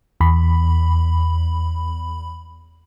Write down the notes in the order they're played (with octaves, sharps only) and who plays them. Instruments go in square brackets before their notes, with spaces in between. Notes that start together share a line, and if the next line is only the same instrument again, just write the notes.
[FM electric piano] E2 B5